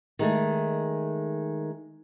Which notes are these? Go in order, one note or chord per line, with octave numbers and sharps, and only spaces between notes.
D#3 G#3 A3